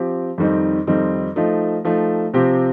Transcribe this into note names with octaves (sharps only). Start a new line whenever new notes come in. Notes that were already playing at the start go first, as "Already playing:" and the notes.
Already playing: F3 C4 G4
F2 D#3 G3 C4 D#4
F2 D#3 G3 C4 D#4
F3 A3 D#4
F3 A3 D#4
C3 F3 C4 G4